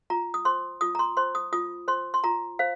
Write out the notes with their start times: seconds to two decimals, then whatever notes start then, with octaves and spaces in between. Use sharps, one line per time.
0.10 F4 A#5
0.34 D#6
0.45 C5 C6
0.81 F4 D#6
0.95 A#5
0.99 C6
1.17 C5 C6
1.35 D#6
1.53 F4 D#6
1.88 C5 C6
2.14 C6
2.24 F4 A#5
2.59 C5 F5